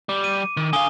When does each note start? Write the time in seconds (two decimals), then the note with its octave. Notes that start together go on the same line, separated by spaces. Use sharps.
0.09 G3 D6
0.24 D#7
0.57 D#3
0.73 D3 F5 G#5 D#6 G7